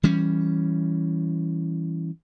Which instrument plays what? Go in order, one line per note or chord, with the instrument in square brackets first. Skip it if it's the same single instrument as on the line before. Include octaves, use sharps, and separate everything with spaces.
[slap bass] E3 G3 C#4